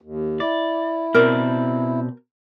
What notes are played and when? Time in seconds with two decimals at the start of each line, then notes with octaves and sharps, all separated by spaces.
0.02 D#2
0.40 E4 D5
1.14 B2 C4 A#4 D5